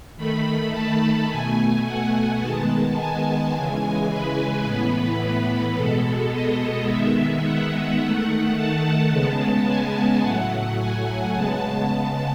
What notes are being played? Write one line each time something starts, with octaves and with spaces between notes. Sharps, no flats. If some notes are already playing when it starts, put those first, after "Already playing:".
D#3 A3 B5
A5
B2 A3 G#5
F#5
D#3 G#3 B3 A5
G#5
C#3 E3 G#3
B4
A2 E3 B3
B2 G#3 B3 A4
D#5
D#3 G#3 B3 E5
F#5
D#3 A3
A5
C#3 G#3 B3
G#5
A2 F#3 A3 F#5
G#5
C#3 G#3 B3 A5
A5